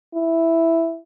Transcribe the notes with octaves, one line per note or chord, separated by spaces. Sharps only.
E4